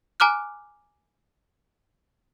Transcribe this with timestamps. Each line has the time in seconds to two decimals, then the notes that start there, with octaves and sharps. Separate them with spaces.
0.20 G#5 A#5 D6 F6 F#6